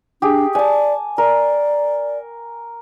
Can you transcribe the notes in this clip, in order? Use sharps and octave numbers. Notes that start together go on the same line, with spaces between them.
D4 G4 G#4
D5 G#5 A5
A#4 D5